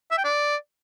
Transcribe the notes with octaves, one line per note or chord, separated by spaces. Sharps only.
E5
G5
D5